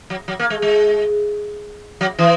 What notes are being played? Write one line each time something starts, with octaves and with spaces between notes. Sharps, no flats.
F#3
F#3
A#3
G#3
G#3
F#3
E3